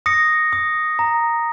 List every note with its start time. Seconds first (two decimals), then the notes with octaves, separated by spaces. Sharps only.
0.06 D#6 A#6 C#7
0.53 D#6
0.99 A#5